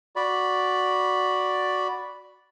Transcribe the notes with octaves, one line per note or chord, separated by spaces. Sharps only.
F#4 D5 B5